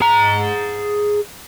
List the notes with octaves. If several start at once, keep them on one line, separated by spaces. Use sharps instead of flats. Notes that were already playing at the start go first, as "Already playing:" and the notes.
G#4 A#5